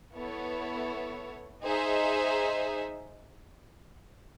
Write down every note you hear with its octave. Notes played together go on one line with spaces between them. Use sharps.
B3 E4 A4 C#5
D#4 G#4 C5 E5